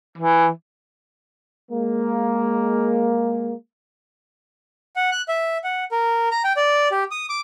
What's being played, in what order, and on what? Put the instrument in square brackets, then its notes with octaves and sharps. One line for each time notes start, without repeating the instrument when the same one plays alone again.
[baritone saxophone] E3
[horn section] G#3 A#3
[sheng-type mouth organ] F#5
F#6
E5
F#5
A#4
A#5
G5
D5
G4
D#6
D6